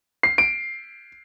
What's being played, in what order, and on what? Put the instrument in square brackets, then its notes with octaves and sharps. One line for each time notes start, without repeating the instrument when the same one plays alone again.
[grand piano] C7
D7